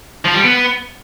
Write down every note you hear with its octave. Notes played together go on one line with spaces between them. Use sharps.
F3
G3
B3